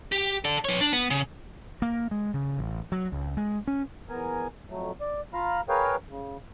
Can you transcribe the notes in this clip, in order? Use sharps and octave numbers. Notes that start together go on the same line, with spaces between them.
G4
A4 D5
B4 C#5
D4
B3
C#3
A#3
G#3
C#3
A1
F#3
C#2
G#3
C#4
E2 B3 A#4 G#5
F2 F#3 A3
D5
F4 F5 A#5 B5 F6
G#4 A#4 B4 C#5 F5 G5
C#3